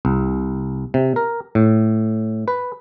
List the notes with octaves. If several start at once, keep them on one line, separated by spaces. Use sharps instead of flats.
C2
C3
A#4
A2
B4